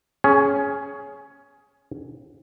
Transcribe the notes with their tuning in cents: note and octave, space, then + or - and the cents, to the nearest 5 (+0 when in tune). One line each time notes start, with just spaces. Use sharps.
C#4 +10 G#4 +15